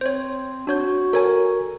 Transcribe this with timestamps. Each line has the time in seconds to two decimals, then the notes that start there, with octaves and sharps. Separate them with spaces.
0.01 C4 C5 C#5
0.67 D4 F#4 C#5 G6
1.13 A4 A#4 C#5 G#5